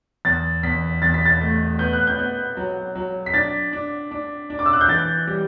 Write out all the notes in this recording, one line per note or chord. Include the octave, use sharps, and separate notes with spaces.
E2 A6
E2 B6
E2 A6
B6
A6
A3
B3 G6
F#6
G6
B3
F#3
F#3
B6
D4 A6
D4
D4
D4
D6
E6
F#6
G6
E3 A6
G3